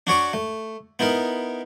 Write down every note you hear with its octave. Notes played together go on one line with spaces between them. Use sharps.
D4 F#4 C#5 D5
A3
B3 D#4 E4 A#4